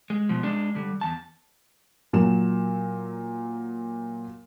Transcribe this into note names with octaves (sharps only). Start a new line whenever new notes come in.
G#3
B2 F3
G#3 D4
D3 G3
E2 A5
A#2 F#3 E7